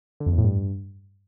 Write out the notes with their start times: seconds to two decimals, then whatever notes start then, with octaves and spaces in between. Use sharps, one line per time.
0.20 D3
0.26 F2
0.32 E2
0.38 A2
0.44 G2